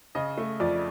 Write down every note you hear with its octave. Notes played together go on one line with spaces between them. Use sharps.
C#3 D#5
A3
F2 D5